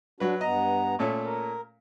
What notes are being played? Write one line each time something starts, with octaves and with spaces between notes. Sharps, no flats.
F#3 D4 F#4 B4
G2 B3 D#5 A#5
A#2 A3 C#4
A#4